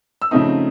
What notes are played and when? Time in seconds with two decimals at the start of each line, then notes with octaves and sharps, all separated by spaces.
0.22 E6
0.31 C#3 F3 A3 C4 D#4 D#6